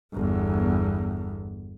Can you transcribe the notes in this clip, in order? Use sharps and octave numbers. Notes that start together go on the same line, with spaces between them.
G1 E2